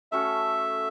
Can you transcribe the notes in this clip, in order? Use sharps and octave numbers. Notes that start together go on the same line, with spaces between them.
A3 C#4 F#4 A4 E5